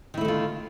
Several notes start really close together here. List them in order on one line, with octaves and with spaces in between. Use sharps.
D#3 E4 A3 D3 F4